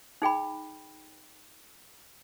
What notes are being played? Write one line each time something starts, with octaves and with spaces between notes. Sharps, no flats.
D#4 G#4 G5 B5